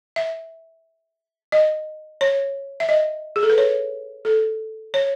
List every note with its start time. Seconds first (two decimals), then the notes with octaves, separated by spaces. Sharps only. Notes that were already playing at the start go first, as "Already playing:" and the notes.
0.16 E5
1.52 D#5
2.21 C#5
2.80 E5
2.89 D#5
3.36 G#4
3.43 A4
3.50 B4
3.58 C#5
4.25 A4
4.94 C#5